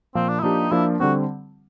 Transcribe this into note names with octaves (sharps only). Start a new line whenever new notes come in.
A#2 F3 A#3 C4
D4
E4
F3 A#3 D4 D#4 G4
F3 A#3 D4 E4 F4
D3 G3 C4 F#4